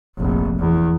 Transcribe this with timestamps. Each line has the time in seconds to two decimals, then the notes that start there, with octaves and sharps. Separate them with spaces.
0.18 F1 A#1
0.60 E2